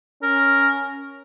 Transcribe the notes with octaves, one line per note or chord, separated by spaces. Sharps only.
C#4 A#4